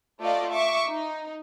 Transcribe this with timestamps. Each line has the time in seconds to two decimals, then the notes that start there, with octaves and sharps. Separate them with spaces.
0.21 A3 F4 D5 D#5 F5
0.53 E5 C#6 D6
0.88 D#4